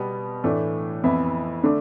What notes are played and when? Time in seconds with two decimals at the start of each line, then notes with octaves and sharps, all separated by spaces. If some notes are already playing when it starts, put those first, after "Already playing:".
Already playing: B2 G3 B3
0.44 A2 E3 A3 D4
1.04 F2 E3 B3 E4
1.64 D3 A3 D4